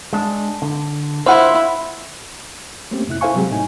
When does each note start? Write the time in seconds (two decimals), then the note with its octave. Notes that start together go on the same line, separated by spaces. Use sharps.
0.13 G#3 D4
0.62 D3
1.26 E4 F4 C5 F#5
2.91 A3 A#3 C4 C#4 G4
3.08 F2 C3 E4 F#6
3.21 E4 A4 C5 F5 G#5 C#6
3.35 C3 F#3 G#3 C4 G4 G#4
3.51 A2 D#4 G#5